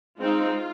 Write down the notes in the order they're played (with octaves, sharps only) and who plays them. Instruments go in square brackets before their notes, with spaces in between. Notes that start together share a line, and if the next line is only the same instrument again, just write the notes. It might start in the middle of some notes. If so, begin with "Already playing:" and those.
[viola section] G#3 C4 D#4 F4